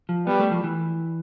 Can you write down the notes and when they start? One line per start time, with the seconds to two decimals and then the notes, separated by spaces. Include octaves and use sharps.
0.09 F3
0.26 G3 B3
0.40 A3
0.51 F3
0.64 E3